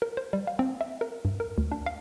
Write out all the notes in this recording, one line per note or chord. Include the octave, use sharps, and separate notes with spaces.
A#4
C5
G3
F5
C4
E5
A#4
G2
A#4
D2
D4
F5